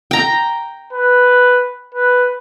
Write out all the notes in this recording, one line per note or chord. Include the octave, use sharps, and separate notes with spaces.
G5 A#5
B4
B4